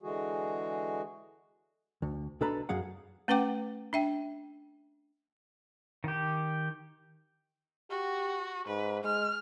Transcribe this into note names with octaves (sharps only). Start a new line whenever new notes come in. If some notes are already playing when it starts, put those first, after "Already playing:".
D3 E3 G#3 F#4 G#4
D2
B1 D4 A4 B4 A#5
F#2 F#3 G#4 F5 F#5
A3 C#4 B4 F#5 G5 D6
D4 E5 G5
D#3 G4
F#4 G4
G#2 B4
G#3 F6